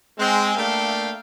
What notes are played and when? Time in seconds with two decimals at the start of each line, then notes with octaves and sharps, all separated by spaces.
0.19 G#3 C4
0.57 A3 A#3 D4 E5 F5 G5